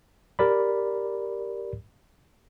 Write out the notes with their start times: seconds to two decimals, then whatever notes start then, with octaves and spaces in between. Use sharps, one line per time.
0.39 G4 A#4 D5 B5